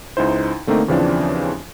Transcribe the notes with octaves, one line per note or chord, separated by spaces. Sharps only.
C#2 D#4 E4 C5
D3 A3 A#3 C4 D#4
D#2 C#3 E3 F3 C4 D4